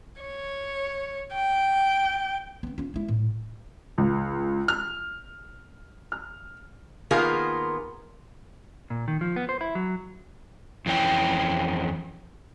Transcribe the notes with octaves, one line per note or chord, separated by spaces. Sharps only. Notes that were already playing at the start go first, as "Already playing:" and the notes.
C#5
G5
B3 C4
C#4 F4
G#3 E4
A2
C#2
F6
F6
D#3 A#3 B3 F4 G#4 A#4
A#2
D#3
F3
B3
C5
E4
F#3
F2 E3 C#4 G5